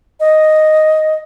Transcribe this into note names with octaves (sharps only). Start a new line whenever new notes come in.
D#5